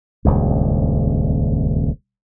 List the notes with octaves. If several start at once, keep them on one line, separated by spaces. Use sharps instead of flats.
D#1 C#2 G2